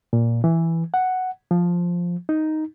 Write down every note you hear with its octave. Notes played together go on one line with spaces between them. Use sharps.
A#2
E3
F#5
F3
D#4